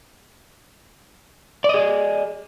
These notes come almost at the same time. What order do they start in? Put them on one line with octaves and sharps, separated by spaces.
D5 D#5 G#4